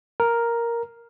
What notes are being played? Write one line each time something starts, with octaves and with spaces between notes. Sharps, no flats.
A#4